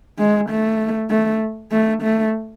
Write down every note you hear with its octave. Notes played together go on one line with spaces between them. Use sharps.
G#3
A3
A3
A3
A3